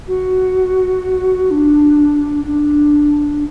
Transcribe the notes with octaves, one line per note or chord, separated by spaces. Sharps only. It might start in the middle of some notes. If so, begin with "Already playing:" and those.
F#4
D4
D4